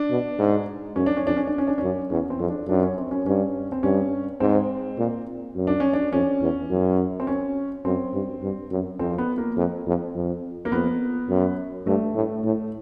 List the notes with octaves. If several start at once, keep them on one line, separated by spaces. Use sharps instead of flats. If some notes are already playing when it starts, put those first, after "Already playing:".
Already playing: D4
B2
G#2
F#2 C#4
D4
C#4
F2 D4
C#4
D4
C#4
D4
F#2 C#4
E2 C#4
C4
F2
D4
F#2 D4
C#4
C4
C#4
G2 C#4
C4
G2 C#4
G#2 C4
A#2
F#2
D4
C#4
D4
F2 C#4
E2
F#2
C4
C#4
F#2 C4
G2
G2
F#2
F2 C4
B3
A#3
F2
F2
F2
A#3
F2 B3
F#2
G2 A3
A2
A2